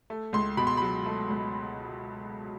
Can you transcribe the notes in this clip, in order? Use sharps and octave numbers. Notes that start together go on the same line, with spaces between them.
A3
C#2 C6
B2 B5
C6
F#3 B5
A3
C#2